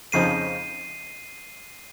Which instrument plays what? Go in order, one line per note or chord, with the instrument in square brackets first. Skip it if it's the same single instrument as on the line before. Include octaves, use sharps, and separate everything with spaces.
[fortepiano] F2 C#3 F3 C4 D#4 [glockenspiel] C7 D#7